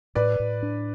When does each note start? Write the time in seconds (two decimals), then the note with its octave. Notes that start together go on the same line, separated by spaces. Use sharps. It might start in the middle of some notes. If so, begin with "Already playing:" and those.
0.15 A2 B4 D5
0.40 A2
0.63 D4